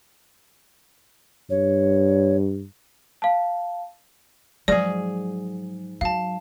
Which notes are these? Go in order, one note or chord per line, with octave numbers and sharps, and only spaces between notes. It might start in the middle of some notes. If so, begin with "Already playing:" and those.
G2 C#5
F5 A5
G#2 F3 F#3 G#4 D5
F#3 F5 A5